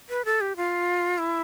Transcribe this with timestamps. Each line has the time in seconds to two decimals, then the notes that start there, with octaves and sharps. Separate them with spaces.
0.09 B4
0.25 A4
0.41 G4
0.56 F4
1.18 E4